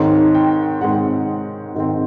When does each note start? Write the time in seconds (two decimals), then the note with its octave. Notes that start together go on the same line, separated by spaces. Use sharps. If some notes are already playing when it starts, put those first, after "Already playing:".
Already playing: G#2 D#3 G#3 C4 C#5
0.35 G5
0.81 G#2 D#3 G#3 C4 F#5
1.75 G#2 D#3 G#3 C4